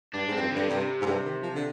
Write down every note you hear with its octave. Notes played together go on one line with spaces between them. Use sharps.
G2 D4
G#2
G2 C4
F2
G2 D3
G2 C3
G#2
G2
D#3
F3
D3